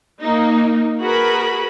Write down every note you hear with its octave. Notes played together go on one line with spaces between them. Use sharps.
A#3 D#4
F#4 G#4 A#4 B4 B5